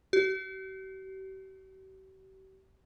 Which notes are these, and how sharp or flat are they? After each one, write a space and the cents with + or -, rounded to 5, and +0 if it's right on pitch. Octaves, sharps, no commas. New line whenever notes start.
G4 -45